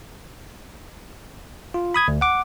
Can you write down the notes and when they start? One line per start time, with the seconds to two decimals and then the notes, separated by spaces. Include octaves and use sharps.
1.74 F4
1.94 B5 D#6 G#6
2.08 D2
2.21 F#5 D6